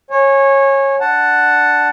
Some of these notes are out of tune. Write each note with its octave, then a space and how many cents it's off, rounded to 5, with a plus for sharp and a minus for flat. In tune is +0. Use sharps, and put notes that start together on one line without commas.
C#5 -20 G#5 +0
D4 +0 F#5 +0 A5 +0